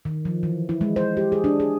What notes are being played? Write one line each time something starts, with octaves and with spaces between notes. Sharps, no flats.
D#3
F3
E3
E4
G#3
C5
G4
G#4
D4
G#4